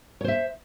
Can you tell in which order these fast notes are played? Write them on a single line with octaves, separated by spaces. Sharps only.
C#5 C5 E5